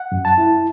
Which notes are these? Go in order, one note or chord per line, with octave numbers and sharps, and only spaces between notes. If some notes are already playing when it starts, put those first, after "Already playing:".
Already playing: F#5
F#2
A5
E4